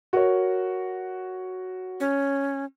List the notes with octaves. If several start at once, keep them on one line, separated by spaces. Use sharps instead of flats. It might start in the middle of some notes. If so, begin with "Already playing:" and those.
F#4 A#4 C#5
C#4